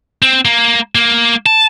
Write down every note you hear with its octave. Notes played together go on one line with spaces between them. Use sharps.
C4
A#3
A#3
A5